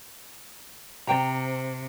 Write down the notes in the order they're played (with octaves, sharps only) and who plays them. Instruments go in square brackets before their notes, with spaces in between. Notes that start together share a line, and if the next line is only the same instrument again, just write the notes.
[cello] C3 [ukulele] C5 G5 A#5